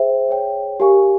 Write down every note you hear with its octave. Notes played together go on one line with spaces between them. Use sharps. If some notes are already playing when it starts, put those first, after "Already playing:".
Already playing: G#4 C5 E5 G5
G#4 C#5 G5
G4 A#4 F5 G#5 C#6